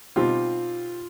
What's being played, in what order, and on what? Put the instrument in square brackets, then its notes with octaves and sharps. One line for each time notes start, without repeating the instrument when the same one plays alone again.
[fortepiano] B2 G3 C4 D#4 G4 [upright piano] F4